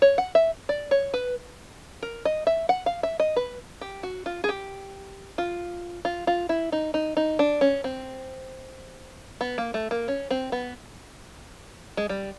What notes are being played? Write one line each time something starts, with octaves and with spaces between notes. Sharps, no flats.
C#5
F#5
E5
D5
C#5
B4
A#4
D#5
E5
F#5
F5
E5
D#5
B4
G4
F#4
F4
G#4
G4
F4
F4
F4
E4
D#4
D#4
D#4
D4
C#4
C4
B3
A#3
A3
A#3
C#4
C4
B3
G#3
G3